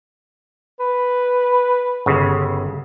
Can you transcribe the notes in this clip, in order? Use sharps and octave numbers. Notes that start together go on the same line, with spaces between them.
B4
G1 C#3